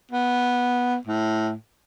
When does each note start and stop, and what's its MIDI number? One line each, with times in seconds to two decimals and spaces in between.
0.12 0.97 59
1.07 1.54 45